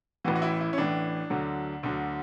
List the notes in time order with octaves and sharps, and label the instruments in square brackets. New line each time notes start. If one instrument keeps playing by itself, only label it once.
[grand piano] A1 A2 E3 F#4
F#4
E4
E4
C#4
A1 A2 E3 D4
D2 D3 F#3
D2 D3 F#3